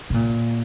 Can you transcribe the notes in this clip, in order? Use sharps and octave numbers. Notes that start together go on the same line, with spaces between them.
B2
A#2